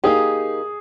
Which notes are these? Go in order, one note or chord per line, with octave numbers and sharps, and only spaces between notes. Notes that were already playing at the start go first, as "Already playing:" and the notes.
A#3 D#4 G4 G#4